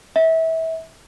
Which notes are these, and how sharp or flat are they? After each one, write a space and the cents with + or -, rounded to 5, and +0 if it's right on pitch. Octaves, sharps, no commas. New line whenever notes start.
E5 -30